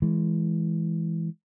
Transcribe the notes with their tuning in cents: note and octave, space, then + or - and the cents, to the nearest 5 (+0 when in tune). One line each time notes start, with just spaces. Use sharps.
E3 +0 G#3 +15